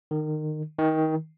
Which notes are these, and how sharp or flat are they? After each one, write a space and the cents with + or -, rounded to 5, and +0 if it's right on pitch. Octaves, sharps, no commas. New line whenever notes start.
D#3 -25
D#3 +20